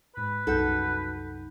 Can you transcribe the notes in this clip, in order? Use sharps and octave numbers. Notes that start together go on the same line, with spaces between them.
G#2 B4 B5
C2 F#2 D#4 F#4 A4 F#5 G6